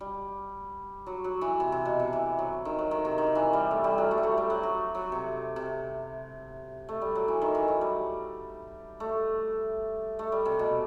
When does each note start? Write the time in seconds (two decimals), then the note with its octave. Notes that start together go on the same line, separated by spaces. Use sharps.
0.01 G3
1.06 F#3
1.24 F#3
1.41 E3
1.60 C3
1.72 C3
1.85 B2
1.99 C3
2.13 E3
2.39 F#3
2.65 D#3
2.79 F#3
2.91 D#3
3.05 C3
3.18 D#3
3.35 E3
3.53 G3
3.71 A3
3.84 G3
3.98 F#3
4.11 A3
4.18 G3
4.23 A3
4.38 G3
4.50 F#3
4.63 F#3
4.95 F#3
5.12 C3
5.56 C3
6.89 A3
7.01 G3
7.15 F#3
7.28 E3
7.42 D#3
7.55 E3
7.68 F#3
7.81 G3
9.00 A3
10.19 A3
10.32 G3
10.45 C3
10.59 B2